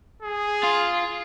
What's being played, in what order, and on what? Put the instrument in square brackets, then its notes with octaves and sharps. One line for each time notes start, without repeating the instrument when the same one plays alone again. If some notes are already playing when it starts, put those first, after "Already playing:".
[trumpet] G#4
[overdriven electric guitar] F4